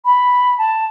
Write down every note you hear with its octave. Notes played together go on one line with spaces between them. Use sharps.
B5
A5